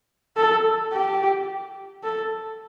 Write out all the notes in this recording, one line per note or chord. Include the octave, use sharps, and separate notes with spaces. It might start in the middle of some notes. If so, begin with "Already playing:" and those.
A4
G4
A4